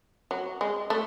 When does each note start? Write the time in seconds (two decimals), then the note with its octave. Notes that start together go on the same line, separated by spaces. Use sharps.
0.31 F#3
0.61 G#3
0.90 A3